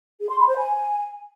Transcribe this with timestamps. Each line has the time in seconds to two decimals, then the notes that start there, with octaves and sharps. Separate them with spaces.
0.20 G#4
0.29 C6
0.38 B5
0.48 C5
0.57 G#5